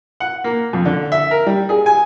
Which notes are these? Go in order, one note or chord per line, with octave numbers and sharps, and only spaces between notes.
F#5
A#3
F2
D3
E5
A#4
G3
G#4
G#5